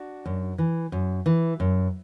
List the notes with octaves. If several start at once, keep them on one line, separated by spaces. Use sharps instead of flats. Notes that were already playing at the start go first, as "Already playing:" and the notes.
Already playing: D4 F#4
F#2
E3
F#2
E3
F#2